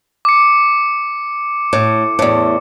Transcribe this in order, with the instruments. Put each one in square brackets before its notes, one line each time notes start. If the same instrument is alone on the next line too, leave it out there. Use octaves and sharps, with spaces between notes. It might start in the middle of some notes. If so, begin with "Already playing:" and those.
[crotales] D6 C#7
[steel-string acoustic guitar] A2
E2 A2